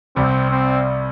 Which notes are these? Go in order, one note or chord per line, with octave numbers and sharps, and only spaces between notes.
C2 C3 G3 C4
C4